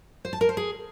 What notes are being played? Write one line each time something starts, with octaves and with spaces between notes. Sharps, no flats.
C5
A5
A#4
C5
G#4